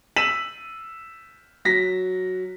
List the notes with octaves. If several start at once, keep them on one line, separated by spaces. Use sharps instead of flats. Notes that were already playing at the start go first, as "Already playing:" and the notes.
E6 B6 D#7 E7 F#7
F#3 A#6 B6